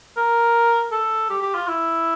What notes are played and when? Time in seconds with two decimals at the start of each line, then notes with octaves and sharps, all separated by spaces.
0.17 A#4
0.92 A4
1.30 G4
1.42 G4
1.55 F4
1.67 E4